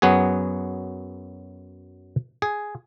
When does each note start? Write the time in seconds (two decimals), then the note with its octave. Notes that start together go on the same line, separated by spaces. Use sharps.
0.02 F#2 F#3 B3 F#4 G#4
2.42 G#4